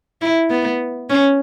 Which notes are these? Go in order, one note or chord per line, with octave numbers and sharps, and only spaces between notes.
E4
B3
C#4